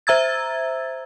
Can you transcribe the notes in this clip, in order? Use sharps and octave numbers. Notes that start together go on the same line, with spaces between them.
C5 E5 A#5 E6 G#6 A6